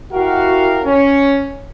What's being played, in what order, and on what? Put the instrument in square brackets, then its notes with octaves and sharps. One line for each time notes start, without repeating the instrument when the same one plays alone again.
[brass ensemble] E4 F#4 G4 A#4 F5
C#4